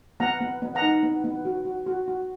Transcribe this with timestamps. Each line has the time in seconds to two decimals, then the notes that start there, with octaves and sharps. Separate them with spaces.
0.20 B3 F#5 A#5
0.41 B3
0.62 B3
0.75 F#5 A#5
0.82 D#4
1.03 B3
1.24 B3
1.45 F#4
1.65 F#4
1.86 F#4
2.08 F#4